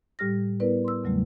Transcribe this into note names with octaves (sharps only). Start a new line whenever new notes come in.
A2 G3 G4 F6 A#6
B3 E4 A#4 B4 D5
C6 E6
E2 C#3 F#3 G3 A3